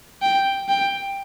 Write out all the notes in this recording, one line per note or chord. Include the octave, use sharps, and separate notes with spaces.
G5
G5